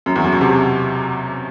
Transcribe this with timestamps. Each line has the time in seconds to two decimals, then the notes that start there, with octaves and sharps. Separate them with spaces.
0.06 F#2
0.16 E2
0.24 F#2
0.33 B2
0.41 C3